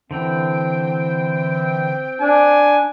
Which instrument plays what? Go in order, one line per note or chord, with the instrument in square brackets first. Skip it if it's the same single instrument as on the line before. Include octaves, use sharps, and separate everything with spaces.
[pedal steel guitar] D3 E3 [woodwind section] C4 G5
[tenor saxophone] D4 [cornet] G#5